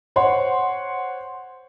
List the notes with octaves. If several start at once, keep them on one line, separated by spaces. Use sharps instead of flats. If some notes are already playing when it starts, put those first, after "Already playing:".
C5 C#5 F#5 C6